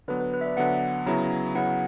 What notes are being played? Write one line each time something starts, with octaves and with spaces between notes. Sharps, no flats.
D3 F#3 B3 B4
B4
B4
E5
D5
D3 F#3 B3 F#5
C#3 F#3 B3 E4 A#5
C#3 F#3 B3 E4 F#5